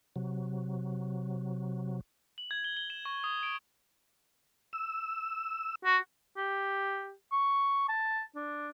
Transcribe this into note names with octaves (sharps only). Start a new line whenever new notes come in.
C3 F#3
F#7
G#6
G7
G7
E7
C#6
D#6
D7
E6
F#4
G4
C#6
A5
D4